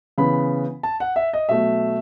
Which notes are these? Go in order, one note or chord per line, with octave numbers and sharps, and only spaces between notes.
C#3 E3 B3 B5
A5
F#5
E5
D#5
B2 F#3 A3 E5